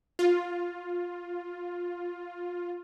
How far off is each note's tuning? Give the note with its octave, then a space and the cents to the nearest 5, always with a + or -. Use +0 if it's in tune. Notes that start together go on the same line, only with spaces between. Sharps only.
F4 +10